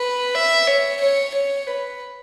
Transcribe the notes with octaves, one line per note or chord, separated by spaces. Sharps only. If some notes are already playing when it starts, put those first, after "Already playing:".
Already playing: B4
E5
C#5
C#5
C#5
B4